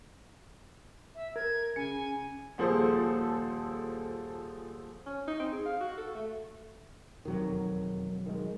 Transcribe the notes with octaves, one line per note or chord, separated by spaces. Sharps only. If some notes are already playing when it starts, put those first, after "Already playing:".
E5
A#4 G#6
C#3 G#5 C#7
D#1 F3 G#4 A4 C5
C#4
D#4
C4
G#4
F5
F#4
A4
A3
E1 F2 D#3 F#3
D#3 G#3